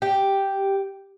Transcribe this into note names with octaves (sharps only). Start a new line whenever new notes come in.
G4